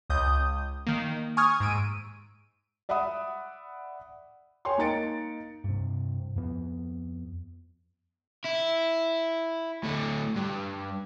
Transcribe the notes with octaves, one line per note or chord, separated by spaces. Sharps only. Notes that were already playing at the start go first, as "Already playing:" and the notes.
C#2 D#6 G6
D#3 A#3
G#5 C#6 D#6 F6 G#6
G#2 E6 D7 D#7
D5 E5 F#5 B5 D#6
C#5 G5 G#5 C6
A#3 D#4 A6 C#7 D7
G2 C3
F2 B3
E4
A2 D3
G2